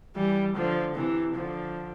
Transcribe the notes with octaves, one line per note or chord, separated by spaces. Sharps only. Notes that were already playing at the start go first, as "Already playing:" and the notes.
E3 G3
D3 F3
C3 E3
D3 F3